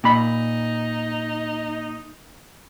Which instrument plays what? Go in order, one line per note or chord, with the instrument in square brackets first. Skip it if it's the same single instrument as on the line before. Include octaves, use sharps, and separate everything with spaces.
[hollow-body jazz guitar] A#2 B5 [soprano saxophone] D#4